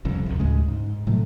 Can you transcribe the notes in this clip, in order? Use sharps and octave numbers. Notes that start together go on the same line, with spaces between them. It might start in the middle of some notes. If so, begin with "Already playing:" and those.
E1 C2 F2 C#3
D#1 A#1 A2 C3
D2 A2 C#3 G#3
G#2
A2 C3 F#3 A3